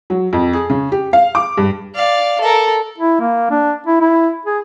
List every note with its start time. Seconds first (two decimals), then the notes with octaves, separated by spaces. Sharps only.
0.10 F#3
0.33 F2
0.53 G#4
0.70 C#3
0.92 G4
1.13 F5
1.35 D6
1.57 G2
1.95 D5 F5
2.41 A4 A#4
2.98 E4
3.20 A#3
3.51 D4
3.87 E4
4.01 E4
4.45 G#4